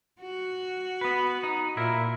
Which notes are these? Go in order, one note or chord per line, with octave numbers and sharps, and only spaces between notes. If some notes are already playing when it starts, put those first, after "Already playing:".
F#4
B3 B4
D#4
A#2 E4 A#4